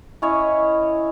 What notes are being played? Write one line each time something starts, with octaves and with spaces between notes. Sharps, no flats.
C#4 E4 C#5 D#5